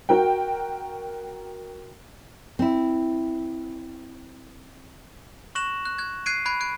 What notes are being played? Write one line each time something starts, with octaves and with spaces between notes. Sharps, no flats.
F#4 A#4 G5
C4 E4
C#6 F#6 A#6 E7 F#7
F#6
F#6 G#6
F#6 G#6 C7 D7 D#7
B5 F#6 G#6 D7
F#6 G#6 D7